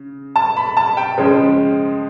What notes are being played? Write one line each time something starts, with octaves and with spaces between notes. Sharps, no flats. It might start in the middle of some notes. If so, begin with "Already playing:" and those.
Already playing: C#3
A5
B5
A5
G5
C#3 F3 G#3 C#4